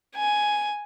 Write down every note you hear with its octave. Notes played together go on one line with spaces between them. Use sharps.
G#5